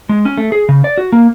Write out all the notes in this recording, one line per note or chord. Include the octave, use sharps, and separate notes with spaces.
G#3
C#4
A3
G#4
C#3
D5
F#4
A#3